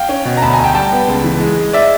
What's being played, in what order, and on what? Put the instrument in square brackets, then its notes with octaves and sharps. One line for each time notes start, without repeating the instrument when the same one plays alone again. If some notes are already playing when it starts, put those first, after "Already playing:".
Already playing: [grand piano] F5 G5
C#4
B2
A#5
D2 A5 B5
G#5 A#5
D2
G5 A5
G3 G5 A5
B3
C#2
E3
G#3
G#3
D5 E5